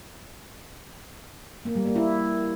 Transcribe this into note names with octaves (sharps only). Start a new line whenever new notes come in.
A#3
G3
A#3
E4